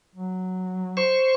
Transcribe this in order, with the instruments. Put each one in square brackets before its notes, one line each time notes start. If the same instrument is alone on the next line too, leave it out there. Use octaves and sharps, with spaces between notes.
[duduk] F#3
[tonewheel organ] C5 C#6